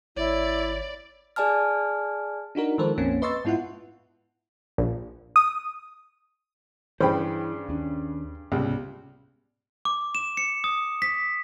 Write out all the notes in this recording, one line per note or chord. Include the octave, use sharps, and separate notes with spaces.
G#1 E4 C#5 D5
G#4 D5 G#5 A5 F6
D4 D#4 F#4 A#4
D#3 F3 G#3 A4 A#4 C5
A#1 F2 A#3 C4 C#4
B4 D#5 C6 C#6 E6 A6
G#2 B3 E4 F4 F#5
A#1
D#6
G2 C#3 E3 C5 G5 B5
D#2 C#4 D4
C#2 G#2 C3 G3 B3
D6
E7
C#7
D#6
B6